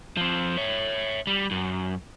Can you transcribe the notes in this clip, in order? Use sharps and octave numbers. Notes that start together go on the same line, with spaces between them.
F3 C4
C#5 E5
G3
F#2